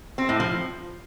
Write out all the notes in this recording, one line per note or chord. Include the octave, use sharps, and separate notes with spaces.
C4
A2
F3